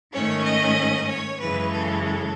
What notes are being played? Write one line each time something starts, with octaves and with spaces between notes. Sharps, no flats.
G#2 D#3 A3 C#4 C#5
D#5
C#5
F#2 C#3 E3 G#3 C#4 B4
A4
A4